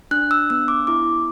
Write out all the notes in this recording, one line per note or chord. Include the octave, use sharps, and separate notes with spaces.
D4 F#6
E6
B3 E6
D6
E4 D6